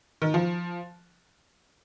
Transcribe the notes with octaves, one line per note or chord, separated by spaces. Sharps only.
D#3
F3